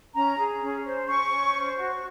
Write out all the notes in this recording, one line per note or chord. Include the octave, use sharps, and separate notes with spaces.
C#4 A#5
G#4
C#4
C5
C#4 C#6
C#4
C5
F#4